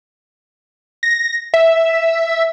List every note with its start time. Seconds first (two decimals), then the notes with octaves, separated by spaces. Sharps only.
1.03 A#6
1.54 E5